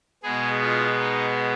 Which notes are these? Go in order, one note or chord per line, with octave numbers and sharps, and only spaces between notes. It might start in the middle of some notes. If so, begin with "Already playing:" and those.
B2 G#3 B3 G#4
F4
D#4